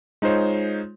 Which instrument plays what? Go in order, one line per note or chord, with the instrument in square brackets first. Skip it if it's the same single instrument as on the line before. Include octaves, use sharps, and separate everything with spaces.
[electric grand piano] G#3 D#4 F4 C5 C#5